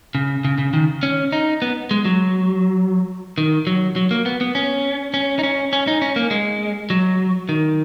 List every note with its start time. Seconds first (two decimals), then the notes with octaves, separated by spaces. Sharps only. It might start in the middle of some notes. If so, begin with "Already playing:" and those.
0.15 C#3
0.45 C#3
0.58 C#3
0.73 D#3
1.03 C#4
1.32 D#4
1.62 B3
1.91 G#3
2.05 F#3
3.38 D#3
3.67 F#3
3.96 F#3
4.11 A#3
4.26 B3
4.41 B3
4.55 C#4
5.14 C#4
5.39 D#4
5.43 C#4
5.73 C#4
5.87 D#4
6.02 C#4
6.16 A#3
6.31 G#3
6.90 F#3
7.49 D#3